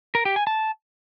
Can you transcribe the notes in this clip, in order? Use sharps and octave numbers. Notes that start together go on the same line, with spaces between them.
A#4
G4
G#5
A5